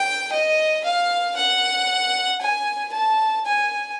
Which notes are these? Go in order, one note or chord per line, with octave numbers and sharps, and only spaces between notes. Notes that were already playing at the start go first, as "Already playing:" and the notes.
Already playing: G5
D#5
F5
F#5
G#5
A5
G#5